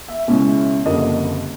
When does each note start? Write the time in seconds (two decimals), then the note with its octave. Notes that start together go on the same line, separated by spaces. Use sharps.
0.08 E5
0.27 C#2 B2 G#3 C#4 E4
0.86 F#1 F2 D3 G3 A#3 D#5